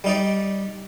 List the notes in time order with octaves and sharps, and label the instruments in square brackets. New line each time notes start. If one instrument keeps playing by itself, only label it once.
[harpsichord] G3 D#4 D5